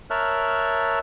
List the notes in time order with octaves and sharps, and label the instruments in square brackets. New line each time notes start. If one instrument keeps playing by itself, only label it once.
[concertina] A#4 C#5 E5 A5 F6 F#6